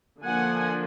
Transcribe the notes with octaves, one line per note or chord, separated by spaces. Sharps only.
D3 F3 A#3 F#5 G#5